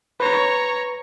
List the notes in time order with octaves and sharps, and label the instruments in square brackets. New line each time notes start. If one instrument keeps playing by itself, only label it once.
[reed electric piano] B4 [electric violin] C#5 A#5